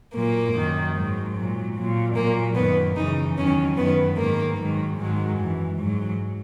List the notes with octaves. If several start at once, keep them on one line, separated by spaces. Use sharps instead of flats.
A#2 F#3 A#3
F#2 D#3 F#3
G#2 F#3
A#2 F#3
A#2 F#3
A#2 F#3 A#3
F#2 D#3 F#3 B3
F#2 C#3 E3 D#4
E2 D#3 F#3 C#4
F#2 D#3 F#3 B3
G#2 D#3 F#3 A#3
G#2 D#3 F#3
G#2 D#3 F#3 G#3
F#2 E3
G#2 F#3